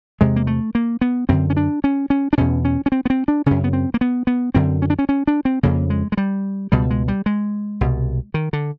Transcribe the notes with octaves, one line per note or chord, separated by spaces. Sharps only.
E2 C3 G#3
A#3
A3
A#3
B3
F#2 D3 C4
C#4
D4
C#4
C#4
D4
E2 B2 C#4
C#4
C#4
C4
B3
C4
D4
F#2 C#3 C#4
B3
C4
A#3
B3
B3
F#2 D3 C4
C#4
D4
C#4
C#4
D4
C4
F2 C#3 A#3
G#3
G#3
G3
C#2 B2 G3
G#3
G3
G#3
C2 B2
D#3
D3